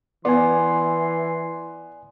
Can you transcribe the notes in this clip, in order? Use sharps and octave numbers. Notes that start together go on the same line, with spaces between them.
E3 B3 D5 G#5 C6